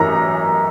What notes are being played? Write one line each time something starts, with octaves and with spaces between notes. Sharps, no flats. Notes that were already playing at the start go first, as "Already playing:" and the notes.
Already playing: F#2 E3 A#5